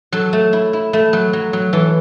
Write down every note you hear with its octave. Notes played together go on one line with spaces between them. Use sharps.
F#3 A4
A3
E4
E4
A3
F#3
F#3
F#3
E3 A4